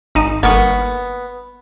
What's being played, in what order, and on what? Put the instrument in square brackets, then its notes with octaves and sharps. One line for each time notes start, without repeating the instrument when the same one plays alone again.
[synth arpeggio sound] G#1 D#4 D#7
[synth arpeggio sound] G1 A#3 C#6 [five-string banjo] B3